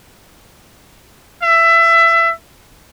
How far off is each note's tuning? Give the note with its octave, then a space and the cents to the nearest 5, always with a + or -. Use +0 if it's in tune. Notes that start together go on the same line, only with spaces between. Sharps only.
E5 +20